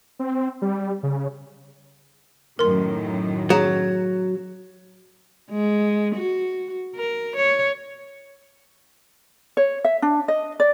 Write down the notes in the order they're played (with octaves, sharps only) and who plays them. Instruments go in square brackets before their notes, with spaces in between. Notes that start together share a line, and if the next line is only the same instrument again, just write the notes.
[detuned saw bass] C4
G3
C#3
[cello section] F#2 A2 D#3 [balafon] A#4 C6
[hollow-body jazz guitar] F#3 [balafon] G#4
[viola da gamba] G#3
F#4
A#4
C#5
[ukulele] C#5
E5
D4
D#5
D5